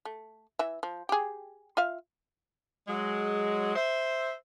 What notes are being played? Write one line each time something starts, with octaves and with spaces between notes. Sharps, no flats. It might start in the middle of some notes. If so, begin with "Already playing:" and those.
A3
E3 E5
F3
G4 G#4
F4 E5 F5
F#3 G#3
C5 E5